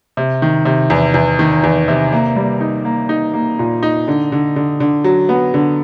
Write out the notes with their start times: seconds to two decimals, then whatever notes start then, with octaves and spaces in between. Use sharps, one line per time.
0.17 C3
0.42 D#3
0.65 C3
0.90 E2
1.14 E2
1.39 D#3
1.63 E2
1.88 C3
2.12 A#3
2.36 G3
2.61 D#4
2.85 A#3
3.09 D#4
3.34 A#3
3.59 A#2
3.83 D#4
4.08 D3
4.32 D3
4.56 D3
4.80 D3
5.04 F#3
5.29 B3
5.54 D3